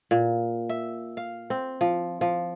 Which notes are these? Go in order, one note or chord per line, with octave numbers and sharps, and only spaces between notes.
A#2
E5
F5
C4
F3
F3